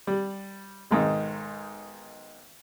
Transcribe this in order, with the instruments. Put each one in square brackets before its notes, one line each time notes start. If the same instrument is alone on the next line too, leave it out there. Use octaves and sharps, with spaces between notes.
[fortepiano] G3
B1 G#2 D#3